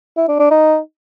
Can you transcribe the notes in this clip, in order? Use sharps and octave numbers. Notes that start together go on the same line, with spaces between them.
E4
D4
D4
D#4